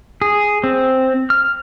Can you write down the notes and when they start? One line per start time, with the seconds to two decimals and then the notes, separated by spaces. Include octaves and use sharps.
0.22 G#4
0.64 C4
1.30 F6